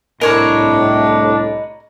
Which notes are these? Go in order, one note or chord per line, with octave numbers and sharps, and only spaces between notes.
C2 A2 D4 A#4 C#5 D#5 B5 C#6